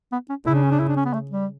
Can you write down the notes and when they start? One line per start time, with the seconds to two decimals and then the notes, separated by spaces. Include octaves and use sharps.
0.12 B3
0.30 C#4
0.47 C#3 E4
0.55 D4
0.63 C#4
0.72 D4
0.80 E4
0.88 D4
0.97 C#4
1.05 B3
1.14 A3
1.31 G3